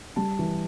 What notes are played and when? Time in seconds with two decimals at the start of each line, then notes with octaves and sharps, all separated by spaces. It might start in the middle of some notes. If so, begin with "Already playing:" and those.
0.16 G3 A5
0.39 E3